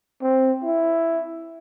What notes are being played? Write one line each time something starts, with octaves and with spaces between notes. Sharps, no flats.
C4
E4